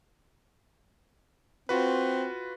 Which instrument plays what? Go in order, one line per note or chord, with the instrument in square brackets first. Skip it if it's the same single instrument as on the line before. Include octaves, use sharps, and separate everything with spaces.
[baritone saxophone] C4 [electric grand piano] F4 F#4 B4